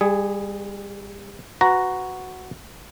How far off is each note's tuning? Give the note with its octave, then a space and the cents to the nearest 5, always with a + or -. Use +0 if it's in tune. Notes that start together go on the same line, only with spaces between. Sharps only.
G3 +30 G#4 +0
F#4 +0 B4 +20 A#5 +0